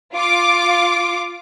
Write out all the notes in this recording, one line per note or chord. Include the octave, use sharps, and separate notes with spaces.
F4 D6